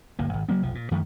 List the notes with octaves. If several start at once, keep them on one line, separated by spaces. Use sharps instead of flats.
D1 G1 A2 A#3
G#1
C#3 F#3 A#3 B3
F1 B1 F3
A#2
F#2 D#3 F3 A3